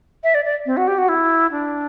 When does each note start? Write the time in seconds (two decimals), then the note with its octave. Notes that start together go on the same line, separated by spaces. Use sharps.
0.24 E5
0.34 D5
0.45 D5
0.66 C4
0.77 F#4
0.88 G4
0.98 F#4
1.09 E4
1.51 D4